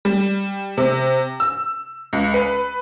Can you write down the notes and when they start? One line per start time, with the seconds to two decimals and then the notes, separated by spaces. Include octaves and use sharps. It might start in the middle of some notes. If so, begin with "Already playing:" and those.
0.05 G3
0.77 C3
1.40 E6
2.13 C#2
2.34 B4